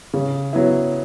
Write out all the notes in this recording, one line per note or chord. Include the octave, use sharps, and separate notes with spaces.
C#3
F#3 B3 E4